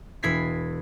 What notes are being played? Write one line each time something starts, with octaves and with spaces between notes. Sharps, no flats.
E1 E4 G#6 B6 C7